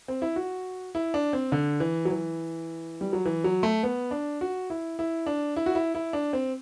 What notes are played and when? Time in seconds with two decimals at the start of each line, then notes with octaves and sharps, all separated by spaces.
0.08 C4
0.22 E4
0.36 F#4
0.95 E4
1.14 D4
1.33 C4
1.52 D3
1.80 E3
2.05 F#3
2.10 E3
3.01 G3
3.13 F#3
3.26 E3
3.44 F#3
3.63 A3
3.83 B3
4.11 D4
4.41 F#4
4.70 E4
4.99 E4
5.26 D4
5.56 E4
5.66 F#4
5.75 E4
5.95 E4
6.13 D4
6.33 C4